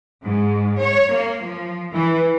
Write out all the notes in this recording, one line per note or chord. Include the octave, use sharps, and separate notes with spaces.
G#2
C#5
A#3
F3
E3